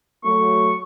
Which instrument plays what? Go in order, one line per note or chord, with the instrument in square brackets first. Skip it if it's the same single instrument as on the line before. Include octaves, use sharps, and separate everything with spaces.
[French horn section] F#3 A3 [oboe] C#6